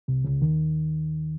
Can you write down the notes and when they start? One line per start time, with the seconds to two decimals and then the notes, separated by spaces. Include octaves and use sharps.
0.08 C2 C3
0.25 C#2 C#3
0.42 D#2 D#3